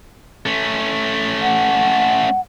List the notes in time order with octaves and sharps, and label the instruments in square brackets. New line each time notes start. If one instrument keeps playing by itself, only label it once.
[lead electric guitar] A3 C#4
[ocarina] F#5